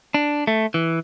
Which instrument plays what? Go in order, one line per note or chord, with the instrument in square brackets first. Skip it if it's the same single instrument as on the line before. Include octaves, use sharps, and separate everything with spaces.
[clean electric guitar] D4
A3
E3